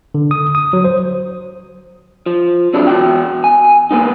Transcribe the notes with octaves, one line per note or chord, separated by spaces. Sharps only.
D3
D#6
D#6
F#3
C5
F3
C3 F#3 D4 E4
E2 F#4 G5
G#5
A#3 B3 D#4